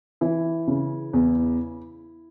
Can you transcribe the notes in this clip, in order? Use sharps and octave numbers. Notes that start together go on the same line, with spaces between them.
E3 E4
C#3
E2